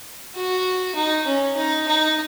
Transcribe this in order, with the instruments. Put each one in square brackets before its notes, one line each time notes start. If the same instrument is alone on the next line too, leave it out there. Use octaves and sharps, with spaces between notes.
[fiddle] F#4
D#4
C#4
D#4
D#4